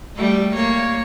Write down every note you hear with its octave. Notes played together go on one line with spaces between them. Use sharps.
G3 A3
A#3 C#5